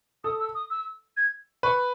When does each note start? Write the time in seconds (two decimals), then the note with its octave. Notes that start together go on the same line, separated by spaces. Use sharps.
0.24 A4 D#6
0.40 E6
0.55 D#6
0.70 E6
1.17 G#6
1.63 B4 C#6